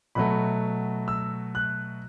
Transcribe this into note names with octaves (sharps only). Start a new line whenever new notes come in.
B2 F#3 A3 B5
E6
F#6